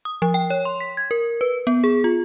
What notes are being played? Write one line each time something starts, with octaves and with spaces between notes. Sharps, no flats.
D#6
F3
G5
C#5
C6
B6
G#6
A#4
B4
B3
G#4
F4